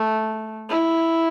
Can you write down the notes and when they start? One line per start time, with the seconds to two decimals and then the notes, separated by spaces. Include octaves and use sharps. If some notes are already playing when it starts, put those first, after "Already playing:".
Already playing: A3
0.70 E4